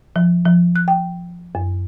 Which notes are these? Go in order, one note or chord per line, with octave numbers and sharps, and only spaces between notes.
F3
F3
F#6
G5
F#2